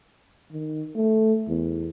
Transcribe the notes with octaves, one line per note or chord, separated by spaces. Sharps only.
D#3
A3
E2